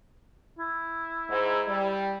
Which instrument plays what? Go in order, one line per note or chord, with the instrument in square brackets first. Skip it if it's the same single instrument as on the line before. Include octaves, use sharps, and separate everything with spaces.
[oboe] E4
[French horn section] G#2
G3